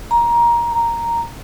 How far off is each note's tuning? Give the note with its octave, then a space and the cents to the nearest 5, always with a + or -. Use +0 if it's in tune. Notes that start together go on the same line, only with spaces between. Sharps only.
A#5 +15
A#5 -5